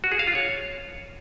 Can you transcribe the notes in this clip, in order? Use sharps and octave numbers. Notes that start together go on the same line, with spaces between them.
F#4
G#4
F5
F4
C#5